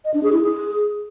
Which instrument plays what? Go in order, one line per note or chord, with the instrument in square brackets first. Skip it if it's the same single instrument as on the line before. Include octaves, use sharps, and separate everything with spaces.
[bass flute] D#5
D4
G#4
E4
G#4